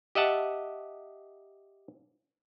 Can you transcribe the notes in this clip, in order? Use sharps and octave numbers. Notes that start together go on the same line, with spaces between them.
G4 D#5 E5 F#5 A5